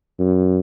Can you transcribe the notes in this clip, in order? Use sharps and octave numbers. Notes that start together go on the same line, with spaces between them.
F#2